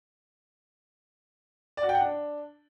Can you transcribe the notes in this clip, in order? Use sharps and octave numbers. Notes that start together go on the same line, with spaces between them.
D5
F#4
G5
F#5
D4